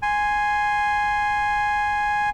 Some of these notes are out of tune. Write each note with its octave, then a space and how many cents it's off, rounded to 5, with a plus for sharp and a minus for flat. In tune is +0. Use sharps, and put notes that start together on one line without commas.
G#5 +0 C6 +0